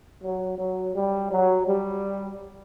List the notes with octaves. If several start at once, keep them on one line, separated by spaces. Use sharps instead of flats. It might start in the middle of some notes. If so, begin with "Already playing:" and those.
F#3
F#3
G3
F#3
G3